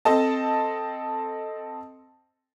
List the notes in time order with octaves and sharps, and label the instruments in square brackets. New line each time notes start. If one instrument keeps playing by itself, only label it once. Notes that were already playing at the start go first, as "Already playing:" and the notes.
[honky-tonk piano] C4 A4 D#5 A5